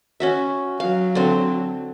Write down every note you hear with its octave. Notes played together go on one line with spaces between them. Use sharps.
C#4 F#4 E5
F#3 F5
D3 C4